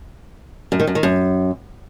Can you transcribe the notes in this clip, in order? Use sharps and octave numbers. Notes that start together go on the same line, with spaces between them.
F#2
D#3
F#2
D#3
F#2